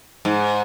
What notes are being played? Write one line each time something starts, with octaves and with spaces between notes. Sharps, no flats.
G#2